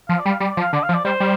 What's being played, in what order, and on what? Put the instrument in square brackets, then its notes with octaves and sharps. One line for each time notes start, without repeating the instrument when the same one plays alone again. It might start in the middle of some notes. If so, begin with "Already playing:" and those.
[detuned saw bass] F3 [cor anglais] F5
[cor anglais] D5
[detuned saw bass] G3
[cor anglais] F5
[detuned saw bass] G3 [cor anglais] D5
[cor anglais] D5
[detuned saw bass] F3
[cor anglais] F5
[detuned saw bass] D3 [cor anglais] D5
[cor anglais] F5
[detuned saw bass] F3
[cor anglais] D5
[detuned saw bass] G3 [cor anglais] C5
[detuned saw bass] G3